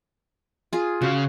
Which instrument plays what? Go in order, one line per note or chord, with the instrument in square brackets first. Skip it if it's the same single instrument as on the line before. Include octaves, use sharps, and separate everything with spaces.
[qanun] F4 G#4
[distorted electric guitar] C#3 F5 [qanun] F#4